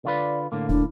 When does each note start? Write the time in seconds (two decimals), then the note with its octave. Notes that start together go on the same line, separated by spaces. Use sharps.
0.05 D3 F4 B4 D5
0.52 A2 D3 A#3 F5
0.69 E1 D4 E4